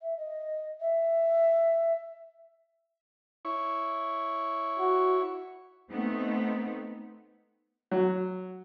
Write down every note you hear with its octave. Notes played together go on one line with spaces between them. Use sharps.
E5
D#5
E5
E4 C#5 C#6
F#4
A3 B3 C4 D#4
F#3